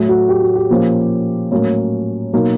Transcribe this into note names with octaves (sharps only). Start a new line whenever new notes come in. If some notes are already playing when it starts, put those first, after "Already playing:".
Already playing: A2 F#3 A3
F#4
G4
F#4
G4
A#2 F3 A#3 C#4
A2 F#3 A#3 C#4
B2 F#3 A#3 D#4